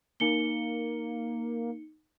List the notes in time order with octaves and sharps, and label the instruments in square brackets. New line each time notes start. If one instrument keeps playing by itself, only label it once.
[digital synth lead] A#3 [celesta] D#4 C#7 G7